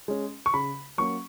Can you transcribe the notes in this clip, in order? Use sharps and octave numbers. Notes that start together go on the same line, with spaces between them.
G#3 C#4
C#6
C#3 B5
F#3 A#3 C#4 C#6